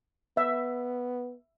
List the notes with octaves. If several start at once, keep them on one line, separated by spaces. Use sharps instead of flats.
B3 E5